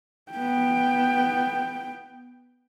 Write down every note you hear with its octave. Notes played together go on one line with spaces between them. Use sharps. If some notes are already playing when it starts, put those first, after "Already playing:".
B3 G5